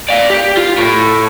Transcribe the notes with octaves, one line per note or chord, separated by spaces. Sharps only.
D5 F5
G4
F4
A2